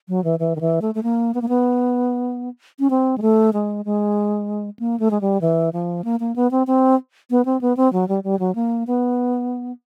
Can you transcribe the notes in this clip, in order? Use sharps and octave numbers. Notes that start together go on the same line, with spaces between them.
F#3
E3
E3
D#3
E3
A3
A3
A#3
B3
A#3
B3
C#4
C4
G#3
A3
G#3
G#3
A#3
A3
G#3
G3
E3
F3
A#3
A#3
B3
C4
C4
B3
C4
B3
C4
F#3
G3
G3
F#3
A#3
B3